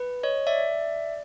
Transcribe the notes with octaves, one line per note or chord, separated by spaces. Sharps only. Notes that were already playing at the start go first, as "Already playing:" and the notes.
Already playing: B4
C#5 D#5
D5 E5